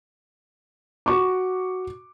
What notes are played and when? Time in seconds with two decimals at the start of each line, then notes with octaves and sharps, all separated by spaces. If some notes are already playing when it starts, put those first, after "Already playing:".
1.06 F#4 C#6 D6